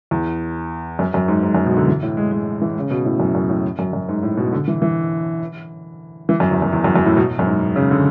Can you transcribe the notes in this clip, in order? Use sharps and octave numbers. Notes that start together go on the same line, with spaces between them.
E2
F#2
F#2
G#2
G#2
F#2
B2
D3
E3
A2
G#3
G#3
E3
C#3
B2
A2
F#2
F#2
A2
F#2
F#2
G#2
A2
B2
D3
E3
E3
E3
F#2
E2
F#2
E2
F#2
F#2
A2
B2
F#2
G#2
C#3
D3